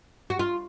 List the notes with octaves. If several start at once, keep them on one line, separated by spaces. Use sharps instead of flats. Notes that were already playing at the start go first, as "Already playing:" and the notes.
F#4
F4